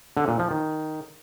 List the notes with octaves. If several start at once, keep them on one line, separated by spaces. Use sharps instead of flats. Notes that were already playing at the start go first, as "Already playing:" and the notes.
D3
A#2
F3
D#3